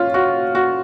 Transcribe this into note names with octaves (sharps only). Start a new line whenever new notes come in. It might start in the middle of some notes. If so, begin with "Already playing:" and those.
Already playing: C#4 F4
F#4
F#4